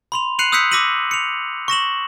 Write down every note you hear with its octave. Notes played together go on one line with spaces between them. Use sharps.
B5 C6 F7
F#6 C7 C#7 D#7 F7 F#7
D#6 E6 F#6 G6 B6 C#7
D6 E6 A#6 B6 D#7 F#7
C#7 F7
C#6 A#6 E7 F#7